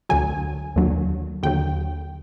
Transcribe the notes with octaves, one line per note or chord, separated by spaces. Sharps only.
D2 D3 F#3 G#5
D#2 D3 F#3
D#2 D3 F#3 G5